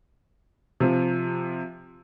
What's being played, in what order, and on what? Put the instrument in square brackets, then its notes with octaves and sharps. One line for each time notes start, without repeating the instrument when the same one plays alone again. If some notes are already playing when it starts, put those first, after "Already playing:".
[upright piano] C3 F3